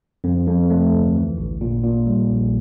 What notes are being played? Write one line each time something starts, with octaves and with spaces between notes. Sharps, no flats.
F2
F2
A3
D2
E3
A1
A#2
A#2
G3
A#1